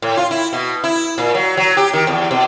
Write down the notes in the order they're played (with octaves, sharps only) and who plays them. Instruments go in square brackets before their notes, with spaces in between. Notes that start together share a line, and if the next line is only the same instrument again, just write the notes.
[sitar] A2
F4
E4
B2
E4
A#2
F#3
F#3
G4
D#3
E2
B2